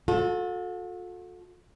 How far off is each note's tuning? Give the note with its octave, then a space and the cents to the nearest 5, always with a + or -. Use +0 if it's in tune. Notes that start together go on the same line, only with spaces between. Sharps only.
F#4 -45 A4 -10